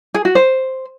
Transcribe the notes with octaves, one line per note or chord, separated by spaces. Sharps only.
G#4
F#4
C5